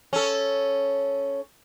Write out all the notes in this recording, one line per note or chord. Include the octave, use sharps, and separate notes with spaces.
C#4 A4